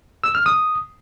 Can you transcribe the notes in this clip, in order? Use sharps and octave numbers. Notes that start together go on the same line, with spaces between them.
E6
F6
D#6